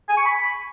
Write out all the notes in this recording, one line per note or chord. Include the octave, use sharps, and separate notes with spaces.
G#5
C#6
B5